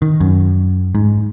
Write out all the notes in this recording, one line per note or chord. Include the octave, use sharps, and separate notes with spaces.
D#3
F#2
G#2